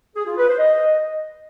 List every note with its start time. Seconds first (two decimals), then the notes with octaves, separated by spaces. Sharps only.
0.15 G#4
0.26 F4
0.37 B4
0.48 C5
0.59 D#5